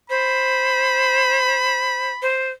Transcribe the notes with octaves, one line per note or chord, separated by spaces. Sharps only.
C5 B5
C5